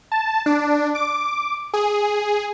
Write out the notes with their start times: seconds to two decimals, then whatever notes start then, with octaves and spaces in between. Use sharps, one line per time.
0.12 A5
0.46 D4
0.95 D6
1.73 G#4